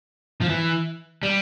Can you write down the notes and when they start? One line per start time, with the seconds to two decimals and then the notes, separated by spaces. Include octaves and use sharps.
0.41 F3
0.49 E3
1.23 G3